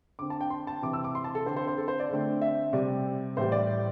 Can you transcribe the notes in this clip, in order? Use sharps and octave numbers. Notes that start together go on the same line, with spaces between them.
D3 C4 D6
A5
G5
C6
A5
C3 E3 C4 D6
E6
D6
C6
A5
A4
D3 C4 C5
C5
C5
A4
C5
D5
D3 A3 C4
E5
C3 G3 C4 D5
A2 E3 G3 C5
D5